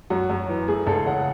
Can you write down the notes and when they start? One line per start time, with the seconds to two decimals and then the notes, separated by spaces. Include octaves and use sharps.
0.10 F#2 F#4
0.30 F#2
0.49 E3
0.68 A3 G#4
0.87 C#2 A4
1.06 C#3 F#5